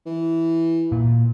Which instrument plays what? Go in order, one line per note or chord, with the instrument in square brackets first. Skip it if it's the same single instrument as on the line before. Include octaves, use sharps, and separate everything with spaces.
[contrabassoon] E3
[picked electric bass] A#2